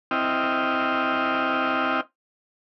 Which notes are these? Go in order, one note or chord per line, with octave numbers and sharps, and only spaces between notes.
C4 E4 D#5 G5 F6